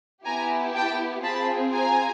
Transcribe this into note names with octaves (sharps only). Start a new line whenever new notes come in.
B3 E4 G4 G#5 A#5
G5 A5
C4 F4 G#4 A5 B5
G#5 A#5